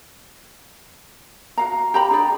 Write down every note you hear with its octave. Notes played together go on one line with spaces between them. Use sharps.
F#4 F5 A#5
G4 A#5 B5
D4 G#4 D5